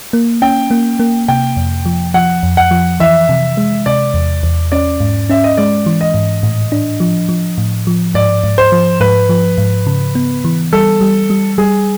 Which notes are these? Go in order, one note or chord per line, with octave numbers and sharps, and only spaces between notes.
A#3
C#4 G5
A#3
A#3
C3 G5
F2
F3
F3 F#5
F2
F#5
F3
E3 E5
C3
G#3
C3 D5
E2
E2
C#4 D5
G#2
C#4 E5
D#5
G#3 D5
E3
D#5
G#2
A2
D4
F3
F3
A2
F3
G#2 D5
G#2
C5
F3
G#2 B4
F3
G#2
C#3
B3
E3
G3 A4
G3
G3
G3 G#4